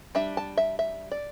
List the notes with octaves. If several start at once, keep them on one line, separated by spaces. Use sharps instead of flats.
G3 D4 E5
A5
E5
E5
D5